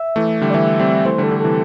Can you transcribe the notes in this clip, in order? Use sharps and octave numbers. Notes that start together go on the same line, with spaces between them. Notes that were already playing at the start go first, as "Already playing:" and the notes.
Already playing: E5
E3 A3
D3 G3
D5
E3 A3 E5
G3 C4
E3 A3 C5
D3 G3 A4
D3
A4
C3 E3